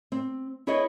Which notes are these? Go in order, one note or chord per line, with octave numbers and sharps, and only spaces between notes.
C4
E4 G#4 B4 C#5 D#5